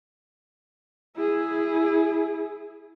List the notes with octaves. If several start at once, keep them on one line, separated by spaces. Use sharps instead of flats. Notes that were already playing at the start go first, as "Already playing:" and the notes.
E4 G#4